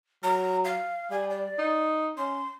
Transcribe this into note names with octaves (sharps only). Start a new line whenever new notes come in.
F#3 A#5
F5
G3 G#5
D5
D#4
C#4 C6